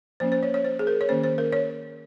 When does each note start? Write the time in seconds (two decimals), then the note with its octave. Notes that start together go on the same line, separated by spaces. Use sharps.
0.20 F3 A#3 C#4 C5
0.32 C5
0.43 C#5
0.54 C#5
0.64 C5
0.79 G#4
0.87 A#4
1.01 C#5
1.09 D#3 A#3 C#4 C5
1.24 C5
1.38 A#4
1.53 C#5